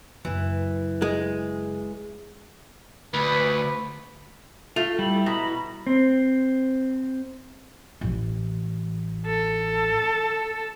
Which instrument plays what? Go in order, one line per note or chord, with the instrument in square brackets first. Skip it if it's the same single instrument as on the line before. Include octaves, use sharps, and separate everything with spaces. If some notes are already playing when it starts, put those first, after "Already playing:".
[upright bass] F#1 [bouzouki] E3
[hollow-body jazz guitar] G#3
[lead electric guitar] D2 [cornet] B4
[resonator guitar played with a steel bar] A3 [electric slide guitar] F4
[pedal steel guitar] G3 [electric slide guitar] E4
[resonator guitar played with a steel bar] B2 [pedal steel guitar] A#5 B5
[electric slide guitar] C4
[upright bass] A1 E3
[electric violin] A4